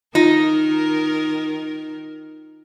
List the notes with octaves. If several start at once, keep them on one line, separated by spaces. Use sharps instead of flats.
D#3 D#4 F4 A#4